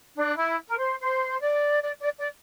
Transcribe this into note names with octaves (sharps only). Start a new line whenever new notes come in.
D4
E4
A#4
C5
C5
D5
D5
D5
D5